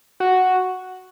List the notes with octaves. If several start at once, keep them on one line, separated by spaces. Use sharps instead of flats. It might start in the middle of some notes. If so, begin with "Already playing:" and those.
F#4